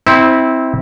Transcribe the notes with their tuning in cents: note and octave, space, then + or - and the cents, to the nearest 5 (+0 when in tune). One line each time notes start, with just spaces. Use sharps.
C4 +0 E4 -25